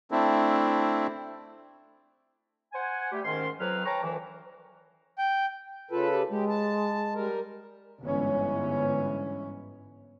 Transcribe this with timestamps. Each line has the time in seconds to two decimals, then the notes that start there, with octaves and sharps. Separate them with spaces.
0.11 A3 C4 D4 E4
2.73 C5 F#5 G#5
3.12 G3 A3 G4
3.25 G#2 D#3 C#4 C6
3.60 F2 F#3 B4 F6
3.85 B4 C#5 G5 A5 A#5
4.02 D2 D#3 E3
5.18 G5
5.91 C#3 F4 A4 B4
6.13 G4
6.30 G#3 G4
6.49 A5
7.14 G3 A#4
8.03 G1 G#2 E3 C#4